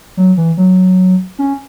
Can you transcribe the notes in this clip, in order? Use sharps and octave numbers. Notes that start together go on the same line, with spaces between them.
F#3
E3
F#3
C#4